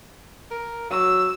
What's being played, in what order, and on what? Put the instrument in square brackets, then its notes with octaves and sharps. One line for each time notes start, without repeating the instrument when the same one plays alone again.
[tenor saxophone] A#4
[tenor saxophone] F#3 [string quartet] E6